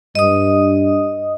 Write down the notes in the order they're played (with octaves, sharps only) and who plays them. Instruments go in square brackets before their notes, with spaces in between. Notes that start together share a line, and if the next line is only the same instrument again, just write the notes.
[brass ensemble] G2 [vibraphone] D#5 D#6